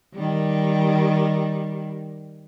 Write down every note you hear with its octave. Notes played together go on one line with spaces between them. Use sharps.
D#3 G3